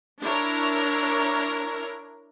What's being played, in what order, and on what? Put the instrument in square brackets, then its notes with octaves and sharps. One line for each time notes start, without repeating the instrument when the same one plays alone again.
[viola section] D4 E4 A#4 C#5